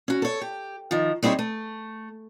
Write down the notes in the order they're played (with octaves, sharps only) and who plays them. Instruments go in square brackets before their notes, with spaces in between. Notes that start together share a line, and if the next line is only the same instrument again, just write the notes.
[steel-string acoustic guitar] C#4 F#4
A4 C#5
G4
D#3 F3
G3 C4 D#4 E4 G#4 C#5
A3